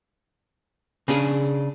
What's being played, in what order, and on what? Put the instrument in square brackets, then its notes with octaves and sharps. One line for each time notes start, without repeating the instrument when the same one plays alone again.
[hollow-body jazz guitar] C#3 D4 G#4